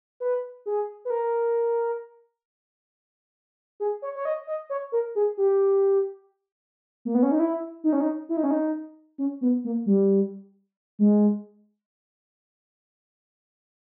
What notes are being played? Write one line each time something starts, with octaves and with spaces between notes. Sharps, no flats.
B4
G#4
B4
A#4
G#4
C#5
C#5
D#5
D#5
C#5
A#4
G#4
G4
A#3
B3
C#4
D#4
E4
D#4
C#4
D#4
E4
D#4
C#4
D#4
C#4
B3
A#3
G3
G#3